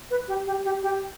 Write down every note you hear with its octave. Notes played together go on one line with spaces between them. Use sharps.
B4
G4
G4
G4
G4